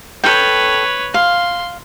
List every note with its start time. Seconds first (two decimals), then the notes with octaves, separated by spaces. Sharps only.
0.24 A4 B4 C#5 G5
1.14 F5 C6